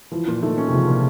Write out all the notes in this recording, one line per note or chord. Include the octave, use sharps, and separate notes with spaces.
E3 F3
A#2
D#3 A3
C#4
C3
C#3 F3
A#2